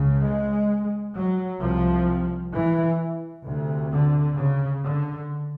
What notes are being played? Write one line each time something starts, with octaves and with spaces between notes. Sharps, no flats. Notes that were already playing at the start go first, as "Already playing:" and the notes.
Already playing: C#2 C#3
G#3
F#3
C2 C3 F3
E3
D2 C3
D3
C#3
D3